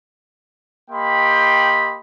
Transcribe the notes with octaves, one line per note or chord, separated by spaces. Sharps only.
A#3 G4 D#5 G5 B5 C6